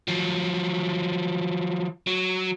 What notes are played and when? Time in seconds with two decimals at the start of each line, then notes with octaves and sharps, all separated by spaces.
0.08 F3 F#3
2.07 F#3